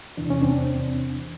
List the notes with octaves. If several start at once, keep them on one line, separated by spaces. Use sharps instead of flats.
E2 C3 E3 D4
C#4
C4 D4